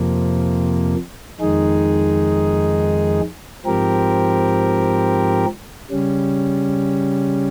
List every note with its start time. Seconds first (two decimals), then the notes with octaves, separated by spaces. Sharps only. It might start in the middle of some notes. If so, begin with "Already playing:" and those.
Already playing: F2 C3 F3 A#3
1.40 F2 D#3 G#3 D#4 G#4
3.66 G#2 F3 C4 G4 A#4
5.90 C#3 G3 C#4